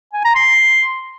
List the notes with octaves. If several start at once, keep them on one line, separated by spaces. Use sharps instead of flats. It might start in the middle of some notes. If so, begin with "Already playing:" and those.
G#5
A#5
C6